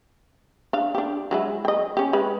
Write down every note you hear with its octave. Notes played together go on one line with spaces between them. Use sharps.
D4 F5
D4 G4
F#3 G#3 E4
D#5 G5
C#4 G4
G#3 B4